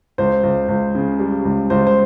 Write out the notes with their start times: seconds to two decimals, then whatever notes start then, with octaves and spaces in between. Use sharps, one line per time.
0.18 C#2 C5
0.43 C#2
0.69 C#2
0.95 C#3
1.19 G3
1.45 C#2
1.70 C#2 C5
1.87 C5